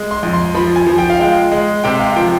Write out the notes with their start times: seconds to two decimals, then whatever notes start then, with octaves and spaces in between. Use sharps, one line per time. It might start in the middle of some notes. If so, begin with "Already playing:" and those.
Already playing: G#3
0.11 C6
0.23 F2
0.33 C6
0.55 F3 B5
0.76 G#5
0.87 F3
0.98 G5
1.10 F5
1.19 G#3 G5
1.52 G#3
1.84 C3 G5
2.00 F5
2.16 F3 G5